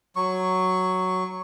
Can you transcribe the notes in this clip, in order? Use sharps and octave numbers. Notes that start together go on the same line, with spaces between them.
F#3 C#6